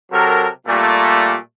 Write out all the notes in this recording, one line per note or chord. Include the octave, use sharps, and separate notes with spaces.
C3 F#3 A4 A#4
A#2 G3 A3